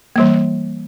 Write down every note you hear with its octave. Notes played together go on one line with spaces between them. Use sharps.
E3 G3 A#3